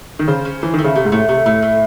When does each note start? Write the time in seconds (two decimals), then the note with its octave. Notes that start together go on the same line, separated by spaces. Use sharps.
0.19 D#3
0.28 C#3 C5
0.45 C#4
0.62 E3 C5
0.74 D#3 A3
0.84 C#3
0.95 C3 A3
1.05 G#2
1.12 A2 A3
1.28 C3 A3
1.45 A2 A3
1.63 A3